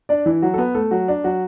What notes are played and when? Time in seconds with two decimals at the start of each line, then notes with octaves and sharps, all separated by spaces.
0.09 D4 D5
0.26 E3 E4
0.42 F#3 F#4
0.54 A4
0.58 B3 B4
0.75 A3 A4
0.91 F#3 F#4
1.08 D4
1.24 F#3 F#4